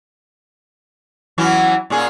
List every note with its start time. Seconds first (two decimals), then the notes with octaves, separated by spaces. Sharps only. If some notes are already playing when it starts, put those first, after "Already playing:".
1.38 E3 F#3 C#4
1.90 A#2 C#4 G#4